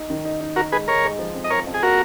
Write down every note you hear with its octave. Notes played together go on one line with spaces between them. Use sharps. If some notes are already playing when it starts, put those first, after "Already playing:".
Already playing: D#4
D#3
D#4
D#4
D#4 F#4 A#4
G#3 G#4 B4
G#3 A#4 C#5
G#3
F3
F2
D#5
F3 A#4 C#5
F2
G#4
A#3 F#4 A#4